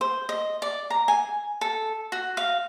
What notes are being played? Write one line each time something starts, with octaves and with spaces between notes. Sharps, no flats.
C5
D#5
D5
A#5
G#5
A4
F#4
F5